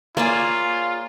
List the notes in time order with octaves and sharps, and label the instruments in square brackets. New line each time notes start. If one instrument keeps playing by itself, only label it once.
[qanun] A#3 [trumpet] F4 [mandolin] G#4 C#5 D5